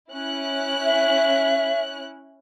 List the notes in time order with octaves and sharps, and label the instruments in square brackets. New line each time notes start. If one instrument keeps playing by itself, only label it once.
[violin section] C#4 E4 F#6
[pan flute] E5